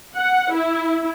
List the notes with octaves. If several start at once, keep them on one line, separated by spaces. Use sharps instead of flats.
F#5
E4